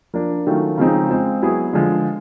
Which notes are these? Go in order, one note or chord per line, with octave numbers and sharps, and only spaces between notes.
F3 A#3 D4
D#3 F#3 A3 C#4 F4
C#3 F3 G#3 C4 D#4
G#3 C4 F4
F#3 B3 E4 G#4
D3 F3 G#3